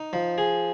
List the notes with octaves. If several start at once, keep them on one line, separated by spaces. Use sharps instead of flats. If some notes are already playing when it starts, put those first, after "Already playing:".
Already playing: D#4
F3
G#4